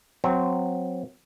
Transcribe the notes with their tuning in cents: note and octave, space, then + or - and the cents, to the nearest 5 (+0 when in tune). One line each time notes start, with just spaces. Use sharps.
F#3 -20 C4 -15